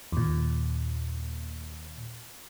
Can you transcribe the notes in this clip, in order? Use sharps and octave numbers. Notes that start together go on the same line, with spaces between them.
D#2 A#2